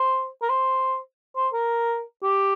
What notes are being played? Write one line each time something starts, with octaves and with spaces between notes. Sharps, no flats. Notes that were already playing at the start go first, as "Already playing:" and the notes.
Already playing: C5
A#4
C5
C5
A#4
G4